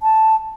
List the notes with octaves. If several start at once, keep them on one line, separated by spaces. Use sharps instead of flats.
A5